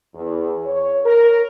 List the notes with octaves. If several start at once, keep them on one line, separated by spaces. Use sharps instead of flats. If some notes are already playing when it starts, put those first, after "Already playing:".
E2
C#5
A#4